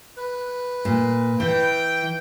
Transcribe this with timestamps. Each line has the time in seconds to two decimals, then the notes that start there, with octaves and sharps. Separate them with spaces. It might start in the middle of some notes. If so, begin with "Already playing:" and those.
0.17 B4
0.85 A#2
1.40 E3 G5